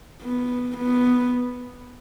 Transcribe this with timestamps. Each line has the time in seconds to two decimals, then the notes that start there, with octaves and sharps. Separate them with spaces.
0.22 B3
0.77 B3